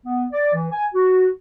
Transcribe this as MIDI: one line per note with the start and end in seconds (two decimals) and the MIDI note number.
0.06 0.25 59
0.32 0.52 74
0.53 0.68 52
0.72 0.86 80
0.94 1.28 66